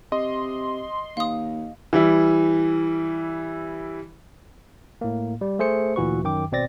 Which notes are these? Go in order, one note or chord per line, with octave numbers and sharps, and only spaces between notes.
C3 D#5 C6
D#2 F5 D#6
E3 G3 E4
A2 A#3
G3
A3 G#4 C5 C#7
D2 A#2 E3 F#4 B4 C#6
F#2 D#3 G5 D6
G#1 B2 C4 D5 A6 A#6